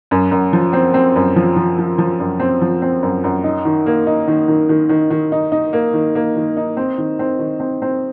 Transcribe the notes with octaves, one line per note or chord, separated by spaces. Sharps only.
F#2
F#2
F3
C4
C4
F#2
F3
F3
F3
F3
F#2
C4
F3
C4
F#2
F#2
D#4
D#3
A#3
D#4
D#3
D#3
D#3
D#3
D#3
D#4
D#4
A#3
D#3
A#3
D#3
D#4
C4
D#3
C4
D#3
C4
C4